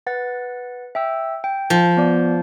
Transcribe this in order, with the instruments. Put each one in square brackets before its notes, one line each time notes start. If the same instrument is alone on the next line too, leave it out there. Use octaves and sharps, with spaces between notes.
[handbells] B4 F#5 A6
E5 G5 E6
G5
[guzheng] F3
[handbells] B3 D5